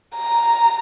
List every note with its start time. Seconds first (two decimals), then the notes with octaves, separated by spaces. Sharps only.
0.16 A#5